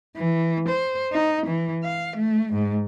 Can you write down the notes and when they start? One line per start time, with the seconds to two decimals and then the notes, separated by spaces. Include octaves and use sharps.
0.16 E3
0.69 C5
1.12 D#4
1.47 E3
1.84 F5
2.16 A3
2.53 G#2